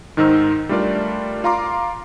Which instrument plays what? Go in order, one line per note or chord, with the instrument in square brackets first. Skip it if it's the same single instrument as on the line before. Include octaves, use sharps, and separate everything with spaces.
[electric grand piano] G#2 D#3 D#4 C5 E6
G3 A3 D4 F4 A#4 D5
F4 F5 A#5 C6 D6